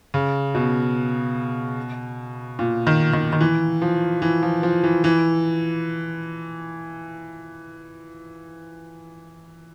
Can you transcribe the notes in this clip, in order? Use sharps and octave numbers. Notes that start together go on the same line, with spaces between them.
C#3
B2
A#2
D#3
D#3
D#3
E3
F3
E3
F3
F3
E3
E3